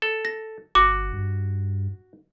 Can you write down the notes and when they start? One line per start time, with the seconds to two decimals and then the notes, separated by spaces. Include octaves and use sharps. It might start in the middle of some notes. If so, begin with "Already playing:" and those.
0.02 A4
0.25 A#6
0.75 G1 F#4 D6
1.12 G2